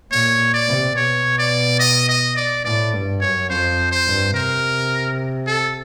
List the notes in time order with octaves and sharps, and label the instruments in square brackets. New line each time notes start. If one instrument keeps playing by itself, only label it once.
[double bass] A#2 [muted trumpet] C#5
[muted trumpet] D5
[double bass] C3
[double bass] B2 [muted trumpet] C#5
[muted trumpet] D5
D#5
D#5
D5
[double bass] A2 [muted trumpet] D5
[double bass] G2
[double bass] F#2 [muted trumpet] C#5
[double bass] F2 [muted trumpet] C5
[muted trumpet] C5
[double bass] G2
[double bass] C3 [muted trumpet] A#4
[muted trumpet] A4